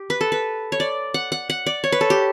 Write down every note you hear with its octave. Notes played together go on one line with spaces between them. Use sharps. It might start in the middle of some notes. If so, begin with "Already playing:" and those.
Already playing: G4
B4
A4
B4
C#5
D5
F#5
F#5
F#5
D5
C#5
B4
A4
G4